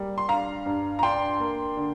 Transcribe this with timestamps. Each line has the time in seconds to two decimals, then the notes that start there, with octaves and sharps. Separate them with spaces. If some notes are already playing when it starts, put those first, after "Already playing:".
Already playing: G3 A#3
0.18 C6
0.29 D4 F5 A#5
0.66 G2
0.99 A#5
1.03 D4 G5 C6
1.40 A#3
1.77 D3